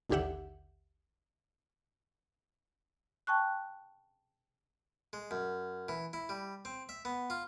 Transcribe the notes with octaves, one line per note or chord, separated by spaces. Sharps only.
A1 D#2 D3 G4 E5 F#5
G5 A5 C#6 F#6
G#3
F#2
E3
E4
G3
C4
E5
B3
F4